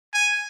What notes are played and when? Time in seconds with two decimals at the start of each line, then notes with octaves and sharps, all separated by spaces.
0.14 G#5